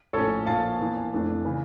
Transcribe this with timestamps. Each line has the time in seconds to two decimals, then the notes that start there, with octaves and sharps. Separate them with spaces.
0.13 A#1 A2 F3 C#4 A4 C#5
0.46 A#1 A#2 F3 F5 A5
0.79 E2 E3 A#3
1.12 F1 F2 E3 A3 D4
1.45 C#3 E3